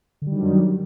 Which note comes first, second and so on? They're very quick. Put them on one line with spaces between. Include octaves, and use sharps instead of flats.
D3 G3 D#3 F#3 F#2